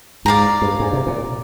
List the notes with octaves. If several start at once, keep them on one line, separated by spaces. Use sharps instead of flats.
G#2 D5 F5 A#5
G2
G#2
C3
A#2